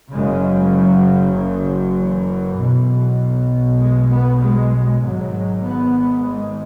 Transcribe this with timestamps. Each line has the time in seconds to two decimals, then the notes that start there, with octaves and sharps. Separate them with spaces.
0.12 F#1 F#2 C#3 G#3
0.73 F#3
1.35 C#3
1.96 E3
2.57 B1 B2
3.79 G#3
4.09 B3
4.40 G#3
5.01 G#1 G#2 F#3
5.62 B3
6.23 G#3